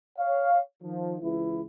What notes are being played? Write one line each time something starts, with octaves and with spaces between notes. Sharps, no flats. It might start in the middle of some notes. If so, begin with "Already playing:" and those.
C#5 F5
D#3 F3
C#2 E3 E4